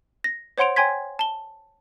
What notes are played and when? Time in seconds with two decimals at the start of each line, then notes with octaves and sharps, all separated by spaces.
0.24 A#6
0.58 C5 C#5 F#5 C6 D7 F7
0.76 C#5 G5 G#5 C6 G#6 B6
1.19 A5 G7